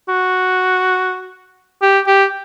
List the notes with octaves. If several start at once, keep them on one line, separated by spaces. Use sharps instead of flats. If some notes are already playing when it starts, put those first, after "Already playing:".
F#4
G4
G4